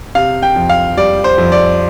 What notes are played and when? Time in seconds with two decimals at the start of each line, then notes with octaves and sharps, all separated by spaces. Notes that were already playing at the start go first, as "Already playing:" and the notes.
0.15 C3 F5
0.43 G5
0.56 F2
0.69 F5
0.97 G3 D5
1.24 C5
1.38 F2
1.52 D5